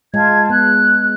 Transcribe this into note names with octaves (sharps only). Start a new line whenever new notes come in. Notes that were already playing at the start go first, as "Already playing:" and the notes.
G#3 F4 A5 G#6
B3 F#6